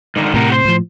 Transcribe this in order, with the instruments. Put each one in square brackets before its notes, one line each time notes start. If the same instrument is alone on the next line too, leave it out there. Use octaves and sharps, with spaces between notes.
[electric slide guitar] G#2 D3 D#3
[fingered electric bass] A2 C3 [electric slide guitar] G4 A#4 F#5
[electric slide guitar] C5
[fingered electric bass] A2 F3